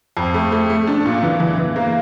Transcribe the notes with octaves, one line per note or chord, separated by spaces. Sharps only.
F2
A3
A3
A3
D4
A#2
E3
E3
E3
A#3